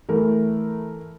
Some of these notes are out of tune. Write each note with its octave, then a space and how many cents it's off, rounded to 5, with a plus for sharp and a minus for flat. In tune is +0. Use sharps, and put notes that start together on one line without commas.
E3 -5 A3 +0 A#4 +0